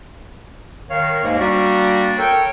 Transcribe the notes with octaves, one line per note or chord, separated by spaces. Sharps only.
D#3 C#5 F5
D#2 G#2 G#3 A#3
G3 A#3 D4 F#4
A4 A#4 C#5 G5